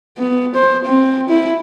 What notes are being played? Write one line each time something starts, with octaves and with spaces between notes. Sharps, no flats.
B3
C5
C4
E4